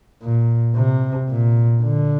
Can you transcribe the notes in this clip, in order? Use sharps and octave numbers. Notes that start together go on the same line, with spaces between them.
A#2
C3
A#2
D3